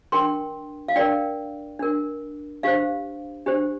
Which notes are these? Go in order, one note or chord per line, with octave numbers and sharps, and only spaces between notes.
D4 A#4 G5 C6
F5
D4 A#4 D5 G5
D4 A#4
D4 G4 C5 F5
D4 G4 C5